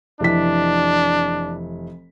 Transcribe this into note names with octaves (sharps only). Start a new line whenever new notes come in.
F1 E3 D4 B6